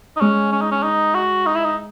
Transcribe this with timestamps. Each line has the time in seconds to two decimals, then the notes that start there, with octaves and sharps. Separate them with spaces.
0.16 D#4
0.21 G#3 C#4
0.52 C#4
0.62 D#4
0.71 C#4
0.83 D#4
1.14 F#4
1.46 D#4
1.55 E4
1.64 D#4